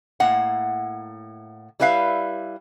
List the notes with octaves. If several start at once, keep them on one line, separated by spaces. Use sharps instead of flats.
A2 A#3 F#5
G3 E4 B4 E5 F5